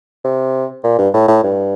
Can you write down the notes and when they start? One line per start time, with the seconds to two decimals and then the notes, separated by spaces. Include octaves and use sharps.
0.24 C3
0.84 A#2
0.98 G2
1.14 A2
1.28 A2
1.44 G2